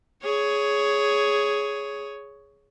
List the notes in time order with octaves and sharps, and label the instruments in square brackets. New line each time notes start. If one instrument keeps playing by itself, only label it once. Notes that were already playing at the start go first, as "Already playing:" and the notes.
[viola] G#4 C#5